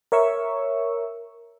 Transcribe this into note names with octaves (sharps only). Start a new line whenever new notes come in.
A#4 C#5 E5 C#6 E6